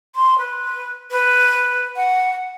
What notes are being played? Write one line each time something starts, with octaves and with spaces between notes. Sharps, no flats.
C6
B4
B4
F#5